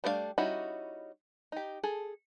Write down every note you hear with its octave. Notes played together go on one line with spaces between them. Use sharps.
G3 A3 D4 D5 F5
G3 C#4 D#4 E4 F#4
D#4 G4
G#4 A4